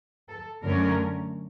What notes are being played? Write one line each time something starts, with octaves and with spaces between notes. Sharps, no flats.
A4
F#2 D3 F#3 A3 C#4 A#4